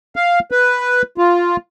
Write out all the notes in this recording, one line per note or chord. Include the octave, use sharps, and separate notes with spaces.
F5
B4
F4